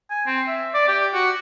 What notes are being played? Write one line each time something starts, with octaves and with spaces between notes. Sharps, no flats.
G#5
C4
E5
D5
G4
F#4